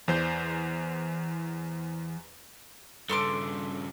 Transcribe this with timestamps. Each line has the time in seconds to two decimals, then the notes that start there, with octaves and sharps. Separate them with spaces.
0.08 E2 E3 G#4 C5 D5 G6
3.09 G2 C#3 A4 C6 D6